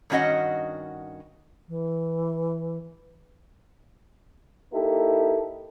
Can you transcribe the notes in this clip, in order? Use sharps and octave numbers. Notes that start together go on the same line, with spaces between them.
G2 D#3 C#4 F#4 D#5 F#5
E3
A#3 D#4 E4 G4 A4